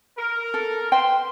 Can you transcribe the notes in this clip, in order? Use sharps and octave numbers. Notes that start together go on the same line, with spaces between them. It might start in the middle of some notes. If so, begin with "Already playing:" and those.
A#4
A4
B4 C5 G5 C6